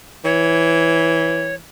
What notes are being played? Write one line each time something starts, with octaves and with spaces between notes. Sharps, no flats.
E3 C#5